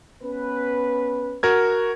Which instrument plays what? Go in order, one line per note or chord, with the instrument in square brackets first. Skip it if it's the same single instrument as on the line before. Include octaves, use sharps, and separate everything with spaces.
[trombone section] B3 C#4 B4
[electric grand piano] F#4 A#4 G#6